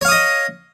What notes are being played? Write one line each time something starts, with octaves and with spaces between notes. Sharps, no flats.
C#5 D#5 F5 D#6